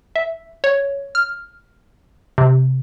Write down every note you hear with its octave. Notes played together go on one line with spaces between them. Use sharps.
E5
C#5
F6
C3